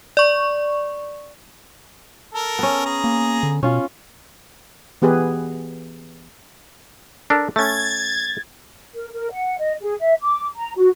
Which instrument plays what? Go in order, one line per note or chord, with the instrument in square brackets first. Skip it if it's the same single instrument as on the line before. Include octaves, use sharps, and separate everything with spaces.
[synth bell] D5 C#6
[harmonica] A4 A#4
[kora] B3 C#4
[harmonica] G#4 A#5
[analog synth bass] A#3
D3
[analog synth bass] B2 [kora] C#4 F4
[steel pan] E3 B3 G4 G#4 B4
[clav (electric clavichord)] D4 A4 A#4
[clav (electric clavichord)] A3 C#4 [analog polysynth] G#6 A6
[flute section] A#4
A#4
F#5
D#5
G#4
E5
D6
A#5
F#4